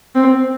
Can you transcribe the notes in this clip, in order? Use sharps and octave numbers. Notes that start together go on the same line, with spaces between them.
C4